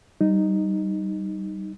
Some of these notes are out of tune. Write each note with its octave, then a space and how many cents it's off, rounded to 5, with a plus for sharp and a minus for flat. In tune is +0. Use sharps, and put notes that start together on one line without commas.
G3 -20 D#4 -5